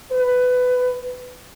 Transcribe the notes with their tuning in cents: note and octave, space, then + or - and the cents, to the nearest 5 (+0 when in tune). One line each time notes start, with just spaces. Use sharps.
B4 +15